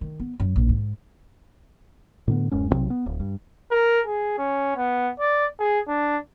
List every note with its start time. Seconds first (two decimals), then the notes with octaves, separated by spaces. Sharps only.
0.01 D#3
0.20 B3
0.40 F#2
0.56 A#1 D#2
0.69 G#2
2.28 A2 D3 B3
2.51 D1 F#2 G#3 C#4
2.71 B1 C3 F#3 C4
2.90 B3
3.06 D1
3.20 G2
3.71 A#4
4.06 G#4
4.38 C#4
4.76 B3
5.20 D5
5.59 G#4
5.88 D4